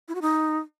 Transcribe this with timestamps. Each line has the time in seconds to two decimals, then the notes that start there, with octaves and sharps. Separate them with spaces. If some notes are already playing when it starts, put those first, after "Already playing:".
0.08 E4
0.15 F#4
0.22 D#4